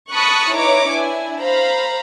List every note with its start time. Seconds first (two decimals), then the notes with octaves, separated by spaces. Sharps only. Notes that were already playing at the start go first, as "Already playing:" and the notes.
0.12 A5 B5 C#6 D#6 F#6
0.54 D#4 E4 B4 C#5 A#5 D6
0.91 D4 E4 G#5
1.40 C5 F5 A#5 B5